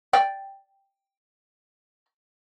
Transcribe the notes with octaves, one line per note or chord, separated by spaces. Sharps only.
D5 G5